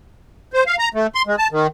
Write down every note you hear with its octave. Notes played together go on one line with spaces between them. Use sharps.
C5
F5
A#5
A3
C6
G#3
A5
D#3